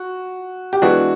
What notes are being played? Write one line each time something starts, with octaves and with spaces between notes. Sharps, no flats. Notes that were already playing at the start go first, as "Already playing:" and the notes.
Already playing: F#4
G4
E3 G#3 B3 D4 F#4